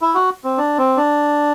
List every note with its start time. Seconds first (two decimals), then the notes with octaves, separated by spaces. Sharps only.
0.02 E4
0.15 F#4
0.44 C4
0.58 D4
0.78 C4
0.97 D4